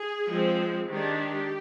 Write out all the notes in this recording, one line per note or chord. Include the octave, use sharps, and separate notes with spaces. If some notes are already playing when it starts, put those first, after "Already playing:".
Already playing: G#4
F3 G#3 C4
D#3 G#3 D4 G4